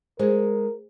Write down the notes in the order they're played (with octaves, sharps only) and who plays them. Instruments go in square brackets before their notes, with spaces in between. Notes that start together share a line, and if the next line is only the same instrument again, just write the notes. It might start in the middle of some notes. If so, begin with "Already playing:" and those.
[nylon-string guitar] G#3 [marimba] G#4 C5 [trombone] A#4